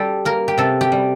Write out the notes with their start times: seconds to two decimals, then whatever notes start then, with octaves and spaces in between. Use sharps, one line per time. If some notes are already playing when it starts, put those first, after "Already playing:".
Already playing: G3 G4 A4
0.25 A#3 A#4
0.48 G4
0.58 C3 A4
0.81 G4
0.92 G3